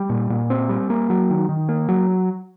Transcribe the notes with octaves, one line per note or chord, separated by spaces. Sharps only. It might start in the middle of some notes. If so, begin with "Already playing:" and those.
Already playing: G3
A#2
A#2
C4
G3
A#3
F#3
D#3
D#3
A#3
F#3